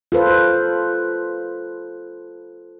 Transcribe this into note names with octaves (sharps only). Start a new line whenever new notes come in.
F4 A4 B4 C5